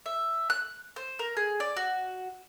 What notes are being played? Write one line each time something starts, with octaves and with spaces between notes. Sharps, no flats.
E5
F#6
C5
A#4
G#4
D5
F#4